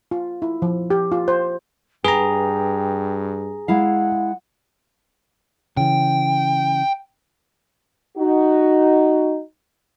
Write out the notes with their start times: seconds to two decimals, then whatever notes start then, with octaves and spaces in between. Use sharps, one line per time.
0.11 F4
0.42 E4
0.62 F3
0.90 G4
1.12 F4
1.28 C5
2.04 G2 G#4 B4 G5 A#5
3.68 G#3 E4 F5 F#5
5.77 C#3 E3 G5
8.17 D#4 F#4